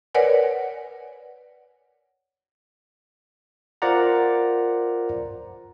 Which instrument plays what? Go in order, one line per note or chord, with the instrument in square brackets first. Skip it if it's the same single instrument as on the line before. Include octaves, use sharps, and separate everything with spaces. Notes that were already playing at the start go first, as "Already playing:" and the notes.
[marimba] A#4 B4 C#5 D5 F#5 G#5
[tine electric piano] F4 A#4 C5 D5 F#5 A#5